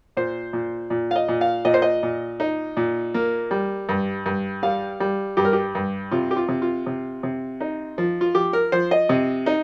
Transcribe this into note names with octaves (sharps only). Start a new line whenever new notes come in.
A#2 C5
A#2
A#2
F5
D#5
A#2
F5
A#2 D#5
C5
D#5
A#2
D#4
A#2
A#3
G3
G2
G2
G3 F5
G3
G2 G4
A#4
G4
G2
C3 F4
G4
F4
C3
F4
C3
C3
D#4
F3
F4
F3 G4
A#4
F3 C5
D#5
C3
D#4